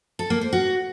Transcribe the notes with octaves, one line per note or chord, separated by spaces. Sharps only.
A4
A#3
C5
F#4